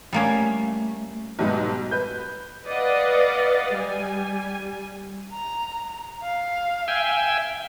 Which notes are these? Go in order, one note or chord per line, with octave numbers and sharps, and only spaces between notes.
G3 A3 A#3 C#4
B1 G#2 G3 B3 D#4
B4 G6
B4 D5 D#5 F5 F#5
G3 G#5
A#5
F5
E5 G5 G#5